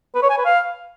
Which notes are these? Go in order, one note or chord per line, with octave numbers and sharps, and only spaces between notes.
B4
C#5
G#5
B4
F5